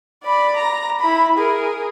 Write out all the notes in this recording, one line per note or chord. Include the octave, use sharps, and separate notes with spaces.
D5 B5
A#5
E4 B5
G#4 A#4